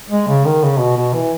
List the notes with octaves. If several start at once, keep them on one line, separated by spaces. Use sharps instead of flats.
G#3
C#3
D#3
C#3
B2
B2
E3